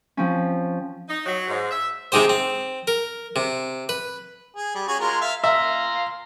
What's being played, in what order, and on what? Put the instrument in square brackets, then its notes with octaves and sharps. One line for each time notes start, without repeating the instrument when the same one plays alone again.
[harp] F3 C4 C#4
[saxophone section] D#4
F#3
G#2
E5
[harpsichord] C3 G#3 D#4 G4 C5
C4
A#4
C3
B4
[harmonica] G#4
G3
C#4 F#4 G#4
G#3 F4 A#4
E5 F5
[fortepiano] E5 [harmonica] F5 A#5 C6